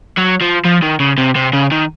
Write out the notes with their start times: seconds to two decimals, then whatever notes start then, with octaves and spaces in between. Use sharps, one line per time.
0.17 F#3
0.41 F3
0.65 F3
0.82 D#3
1.00 C#3
1.18 C3
1.36 C3
1.53 C#3
1.71 D#3